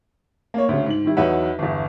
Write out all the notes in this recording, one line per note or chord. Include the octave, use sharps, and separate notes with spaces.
A#3 C#5
D2 C#3
G#2 F#7
D#3 G3 E4
E2 F#3 D#4 B4 E5 F#5
G1 E2